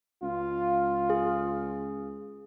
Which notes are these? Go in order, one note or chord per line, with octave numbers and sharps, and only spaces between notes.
C#2 F4
G#4